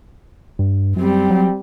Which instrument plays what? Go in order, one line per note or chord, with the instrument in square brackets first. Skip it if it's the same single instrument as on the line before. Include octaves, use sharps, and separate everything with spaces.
[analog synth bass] G2
[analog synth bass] F#2 [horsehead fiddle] G3 C4
[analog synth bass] F#3